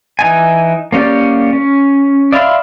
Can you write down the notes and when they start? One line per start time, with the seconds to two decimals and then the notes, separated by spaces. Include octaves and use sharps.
0.19 E3 D#4 G#5
0.92 A#3 C#4 G4 D5
1.53 C#4
2.32 D5 E5 F5 B5 C6